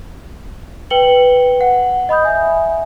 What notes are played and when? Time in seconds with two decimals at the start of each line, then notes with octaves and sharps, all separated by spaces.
0.90 B4 G5 C#7 F#7 G7
1.61 F#5
2.09 D#5 B5 D#6 G6
2.25 E5 G#5